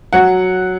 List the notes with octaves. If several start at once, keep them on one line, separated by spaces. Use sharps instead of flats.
F#3 F#5